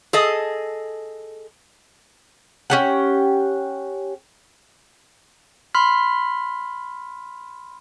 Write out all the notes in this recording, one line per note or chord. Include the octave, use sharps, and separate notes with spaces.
G#4 A4 D#5
C#4 G4 F#5
B5 C6 F6 B6